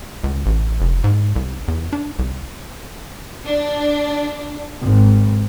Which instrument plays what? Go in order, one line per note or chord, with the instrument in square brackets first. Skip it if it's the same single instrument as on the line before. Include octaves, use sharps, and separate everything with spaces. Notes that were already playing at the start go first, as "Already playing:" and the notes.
[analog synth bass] C#2
A1
F1
G#2
C2
E2
D4
C2
[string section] D4
G#1